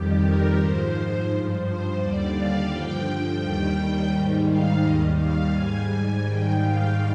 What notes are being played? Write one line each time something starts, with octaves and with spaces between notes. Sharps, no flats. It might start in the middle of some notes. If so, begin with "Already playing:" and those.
Already playing: F2 D#3 G3 G4
A#4
G#2 F3 C5
G2 F3
C5
D#2 D3 G3 D5
F5
G2 D3 F3 G5
D#2 D#3 G3 G5
G#2 D#3 G3
F5
D#2 D#3 G3 D#5
F5
G#2 G3 G#5
G#2 D#3 G3 G5
F5